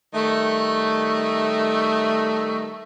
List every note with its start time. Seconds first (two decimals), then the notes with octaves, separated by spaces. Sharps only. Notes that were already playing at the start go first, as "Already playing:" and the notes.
0.14 D#3 G3 A3